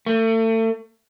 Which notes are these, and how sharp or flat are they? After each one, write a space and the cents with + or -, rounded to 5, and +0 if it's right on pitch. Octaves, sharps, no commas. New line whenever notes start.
A3 +35